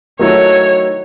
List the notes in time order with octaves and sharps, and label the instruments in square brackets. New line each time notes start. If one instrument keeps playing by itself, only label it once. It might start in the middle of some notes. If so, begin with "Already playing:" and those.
[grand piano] D#3 F#3 A3 E4 [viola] C#5